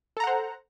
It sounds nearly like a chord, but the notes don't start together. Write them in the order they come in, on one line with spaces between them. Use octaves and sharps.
A4 A#5 F#5 C5